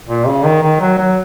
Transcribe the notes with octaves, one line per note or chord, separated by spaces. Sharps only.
A#2
C#3
D#3
D#3
F#3
F#3